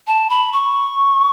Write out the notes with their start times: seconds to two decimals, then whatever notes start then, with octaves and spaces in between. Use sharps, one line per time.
0.07 A5
0.30 B5
0.53 C#6